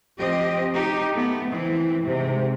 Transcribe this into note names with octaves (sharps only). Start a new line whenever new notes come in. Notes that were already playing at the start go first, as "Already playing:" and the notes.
F3 C4 G4 D#5
D#4 G4
A3 B3
E3 C4
G#2 C3